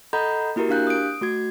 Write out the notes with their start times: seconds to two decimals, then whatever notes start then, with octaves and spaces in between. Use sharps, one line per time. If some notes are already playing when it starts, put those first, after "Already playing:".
0.13 A4 D#5 F#5 A#5 B5 G6
0.56 A#3 E4 F#4 G4 A#4
0.69 D4 G4 F5 F#6 G6
0.87 D#6 D7
1.21 A3 F#4 G#6